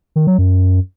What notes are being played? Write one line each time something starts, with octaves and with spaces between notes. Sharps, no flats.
D#3
F#3
F#2